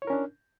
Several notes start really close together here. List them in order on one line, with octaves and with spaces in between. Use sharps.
C#5 E4 A#4 C#4 D4